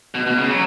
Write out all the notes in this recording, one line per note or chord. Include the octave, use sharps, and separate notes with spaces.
B2
B2
C#3
F#3